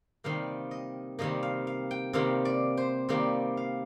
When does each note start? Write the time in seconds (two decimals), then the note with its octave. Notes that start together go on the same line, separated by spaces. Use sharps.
0.24 C3 D#3 G3 A#3 F5
0.71 D#5
1.19 C3 D#3 G3 A#3 D#5
1.43 F5
1.67 F5
1.91 G5
2.13 C3 D#3 G3 A#3 F5
2.45 D5
2.77 C5
3.09 C3 D#3 G3 A#3 D5
3.57 F5